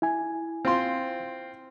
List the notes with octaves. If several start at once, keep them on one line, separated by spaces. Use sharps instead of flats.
E4 G#5
C4 F4 C6